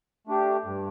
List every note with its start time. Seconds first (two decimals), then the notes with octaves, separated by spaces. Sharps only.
0.27 A3 D4 G4
0.65 G2